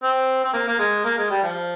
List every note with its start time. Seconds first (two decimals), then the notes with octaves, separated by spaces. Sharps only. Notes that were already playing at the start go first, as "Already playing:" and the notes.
0.03 C4
0.44 C4
0.54 A#3
0.67 A#3
0.79 G#3
1.05 A#3
1.18 G#3
1.31 G3
1.43 F3